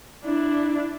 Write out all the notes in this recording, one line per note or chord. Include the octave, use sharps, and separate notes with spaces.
D4 E4